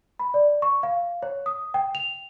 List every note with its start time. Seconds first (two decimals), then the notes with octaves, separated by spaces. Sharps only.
0.19 B5
0.34 D5
0.62 C#6
0.83 F5
1.23 C#5
1.46 D#6
1.74 G5
1.95 F7